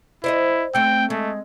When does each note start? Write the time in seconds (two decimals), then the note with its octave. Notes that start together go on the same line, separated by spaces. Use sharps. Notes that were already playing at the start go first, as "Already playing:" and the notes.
0.24 E4 C5 D5 D#5
0.75 A3 C4 G5
1.10 G#3 A3